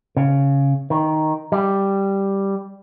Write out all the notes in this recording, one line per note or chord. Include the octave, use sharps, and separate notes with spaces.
C#3
D#3
G3